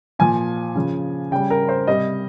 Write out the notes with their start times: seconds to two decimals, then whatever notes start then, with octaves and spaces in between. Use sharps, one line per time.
0.19 A#2 F3 G#5
0.75 C#3 F3
1.31 C#3 G3 G5
1.50 A#4
1.69 C5
1.87 C3 G3 D#5